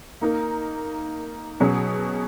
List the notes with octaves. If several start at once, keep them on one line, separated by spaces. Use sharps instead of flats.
A#3 D#4 A#4
B2 F#3 C#4 G#4